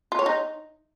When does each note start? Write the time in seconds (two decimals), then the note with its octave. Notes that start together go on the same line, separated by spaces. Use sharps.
0.12 F4
0.19 C#5
0.26 D#4